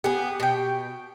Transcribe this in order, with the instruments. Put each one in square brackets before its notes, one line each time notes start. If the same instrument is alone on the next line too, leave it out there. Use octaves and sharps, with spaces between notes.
[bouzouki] B3 G#4 [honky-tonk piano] G4
[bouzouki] B2 G5